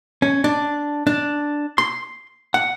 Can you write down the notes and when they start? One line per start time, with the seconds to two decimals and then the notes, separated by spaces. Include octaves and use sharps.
0.22 C#4
0.44 D4
1.07 D4
1.78 C6
2.54 F#5